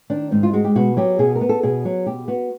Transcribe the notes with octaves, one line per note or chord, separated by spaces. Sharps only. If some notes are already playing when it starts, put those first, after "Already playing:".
D#3 D4
G#2 D#4
F4
G#3 F#4
G4
B2 F#4
F#3 G4
B2 G#4
A#4
B3
A4
B2 G#4
F#3
B2 G4
B3 F#4